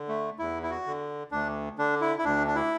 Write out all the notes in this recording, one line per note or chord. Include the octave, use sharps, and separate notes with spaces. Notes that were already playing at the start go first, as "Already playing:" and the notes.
Already playing: D3
A3
E2 E4
E4
F#4
D3
D2 D4
D3 D4
E4
E4
D2 D4
D4
E4